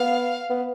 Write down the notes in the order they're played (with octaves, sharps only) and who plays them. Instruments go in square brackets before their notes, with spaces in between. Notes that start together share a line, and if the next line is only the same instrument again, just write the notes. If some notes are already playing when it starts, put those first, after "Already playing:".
Already playing: [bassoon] B3 [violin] F5
[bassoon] B3